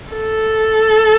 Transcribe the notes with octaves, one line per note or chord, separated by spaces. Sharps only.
A4